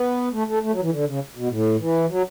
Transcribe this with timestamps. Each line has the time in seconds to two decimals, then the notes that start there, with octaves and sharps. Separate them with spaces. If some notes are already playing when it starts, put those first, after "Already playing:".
Already playing: B3
0.33 A3
0.47 A3
0.63 A3
0.72 F#3
0.82 E3
0.92 D3
1.06 C#3
1.36 B2
1.50 A2
1.79 E3
2.09 F#3